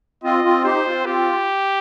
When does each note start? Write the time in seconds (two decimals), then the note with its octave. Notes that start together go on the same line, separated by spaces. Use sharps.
0.24 C4 F4 D#5
0.44 C4 F4
0.65 D#4 G4 C5
0.86 C4 F4
1.06 C4 F4 G4